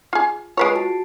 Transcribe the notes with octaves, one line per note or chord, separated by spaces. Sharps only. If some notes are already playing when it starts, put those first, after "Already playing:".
F4 G#4
G#3 F4 B4 C#5 C7 D7
F#4 A5